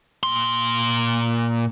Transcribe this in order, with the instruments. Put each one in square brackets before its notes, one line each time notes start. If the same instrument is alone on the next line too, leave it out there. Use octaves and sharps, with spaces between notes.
[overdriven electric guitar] A#2 C6